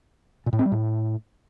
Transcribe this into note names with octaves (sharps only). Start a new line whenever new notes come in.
A#2
A2
C4
G3
A2